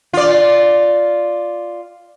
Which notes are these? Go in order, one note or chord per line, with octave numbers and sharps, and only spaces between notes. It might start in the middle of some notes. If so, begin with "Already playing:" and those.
F4 D5